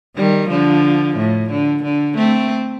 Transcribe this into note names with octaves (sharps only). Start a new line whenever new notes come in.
D#3 G3
D3 F3
A2
D3
D3
A3 C4